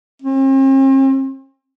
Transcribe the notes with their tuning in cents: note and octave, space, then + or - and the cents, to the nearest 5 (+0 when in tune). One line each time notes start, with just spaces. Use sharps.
C4 +45